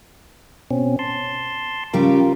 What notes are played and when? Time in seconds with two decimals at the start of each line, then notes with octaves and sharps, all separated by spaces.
0.71 B2 C4 C#4
0.99 A5 C6
1.93 C#3 G3 F4 G4 A#4